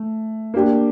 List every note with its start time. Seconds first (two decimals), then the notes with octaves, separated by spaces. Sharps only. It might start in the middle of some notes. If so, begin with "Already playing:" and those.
Already playing: A3
0.54 A#3 D4 G4